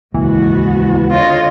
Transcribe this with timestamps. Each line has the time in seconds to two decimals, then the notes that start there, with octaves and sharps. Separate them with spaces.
0.14 D#1 C#2 G#2 E3 A#3 B3 F#4
1.11 D3 F4 C#5 D#5